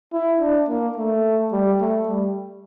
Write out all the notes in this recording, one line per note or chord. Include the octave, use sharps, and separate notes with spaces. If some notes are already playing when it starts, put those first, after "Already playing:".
E4
D4
A#3
A3
G3
A3
G3